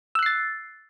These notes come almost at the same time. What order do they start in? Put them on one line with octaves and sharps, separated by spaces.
E6 F#6 C7 A6